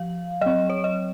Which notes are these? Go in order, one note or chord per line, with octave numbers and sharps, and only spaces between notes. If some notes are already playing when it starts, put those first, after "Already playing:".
Already playing: F3 F5
F#3 C4 D#5
C#5
D#5